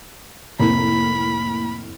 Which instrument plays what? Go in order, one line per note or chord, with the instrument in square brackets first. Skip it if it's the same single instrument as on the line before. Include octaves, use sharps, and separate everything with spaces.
[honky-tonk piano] F1 A2 [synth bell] A#3 [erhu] B5